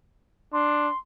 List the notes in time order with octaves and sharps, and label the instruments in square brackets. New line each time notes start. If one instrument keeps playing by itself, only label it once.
[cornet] D4 [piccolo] C6